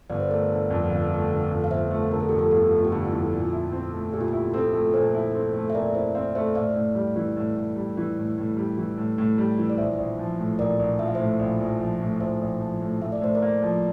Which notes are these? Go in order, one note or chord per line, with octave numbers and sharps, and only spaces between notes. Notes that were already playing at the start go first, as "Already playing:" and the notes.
G1 D5
C5
A3 A#4 D5
D3
F2
G1
A3
D3
F2
F5
G1 C5 E5
A3
D3 A#4
A4
F2 G4
F4 A4
G1 F4 A4
A3 F4
G4
D3 F4
F4
F2 E4
A#2 F4
E4
C4
A3
A#2 G4
F4
E4 G4
C4 F4 A4
A3
A#2 A4 C5
E4
C4
A3
E5
A#2 A#4 D5
E4 C5 E5
C4 D5 F5
A3 C5 E5
A2 D5 F5
A2
G3
E3
A2
A2
G3
E3
A2
A2
G3
E3
A2
A2
G3
E3
D5
A#1 C5 E5
A#1
F3
A2
A#1 A#4 D5
A#1
F3 E5
F5
A2 C5 E5
A#1
A#1
F3
A2
A#1 C5 E5
A#1
F3
A2
A2 E5
D5
A2 C5
A#4 D5
A#3
F3